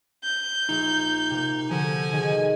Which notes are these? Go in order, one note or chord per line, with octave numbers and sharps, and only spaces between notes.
G6
A#1 D#4
C3 A#3
D3 F3 F#4 A4 G#5
D#3 G#4